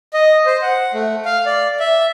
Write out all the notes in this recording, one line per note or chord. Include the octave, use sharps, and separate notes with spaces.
D#5
C5
F#5
A3
F5
D5
E5